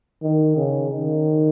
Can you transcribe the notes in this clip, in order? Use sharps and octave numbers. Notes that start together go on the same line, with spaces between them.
D#3
C#3
D#3